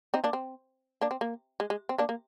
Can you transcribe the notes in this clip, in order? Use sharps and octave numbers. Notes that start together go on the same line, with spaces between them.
C4 D#4
A#3 D4
C4
A#3 D4
C4
A#3
G#3
G#3
C4
A#3 D4
A#3